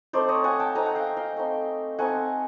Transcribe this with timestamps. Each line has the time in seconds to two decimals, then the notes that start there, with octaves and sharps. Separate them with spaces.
0.13 A3 C4 D#4 C5 D5
0.29 C#5 D#5
0.44 F#5 G#5
0.60 G5 A5
0.75 A3 C4 D#4 G#5 A#5
0.86 F#5
0.95 F5 G5
1.17 F5 G5
1.37 A3 C4 D#4
1.98 A3 C4 D#4 F#5 G#5